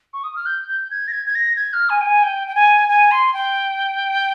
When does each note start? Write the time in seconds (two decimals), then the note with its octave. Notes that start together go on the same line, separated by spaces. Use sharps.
0.13 C#6
0.24 D#6
0.36 F6
0.46 G6
0.68 G6
0.90 G#6
1.08 A#6
1.12 G#6
1.26 G#6
1.35 A#6
1.56 G#6
1.73 F6
1.89 G#5
2.01 G5
2.06 G#5
2.23 G5
2.48 G5
2.55 G#5
2.89 G#5
3.11 C6
3.33 G5